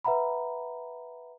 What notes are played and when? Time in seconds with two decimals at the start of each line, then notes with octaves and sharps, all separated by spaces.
0.05 B4 E5 F#5 A#5 B5